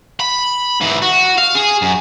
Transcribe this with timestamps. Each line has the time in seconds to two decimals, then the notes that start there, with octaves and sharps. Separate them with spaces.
0.20 B5
0.81 G#2 E3
1.02 F#4
1.38 F5
1.55 G#4
1.82 F#2